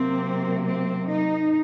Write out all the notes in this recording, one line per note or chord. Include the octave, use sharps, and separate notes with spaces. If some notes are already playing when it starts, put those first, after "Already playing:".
Already playing: C3 F#3 A#3 C4
C4
D#4